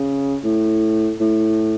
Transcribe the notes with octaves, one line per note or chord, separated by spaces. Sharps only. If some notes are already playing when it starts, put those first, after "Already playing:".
Already playing: C#3
A2
A2